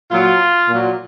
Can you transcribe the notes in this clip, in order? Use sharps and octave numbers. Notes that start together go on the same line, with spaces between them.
A#2 F#3 F4
A#2 F#3